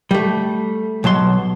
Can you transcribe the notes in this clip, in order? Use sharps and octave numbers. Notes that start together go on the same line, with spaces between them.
G3 A3
B1 F#3 A5 C6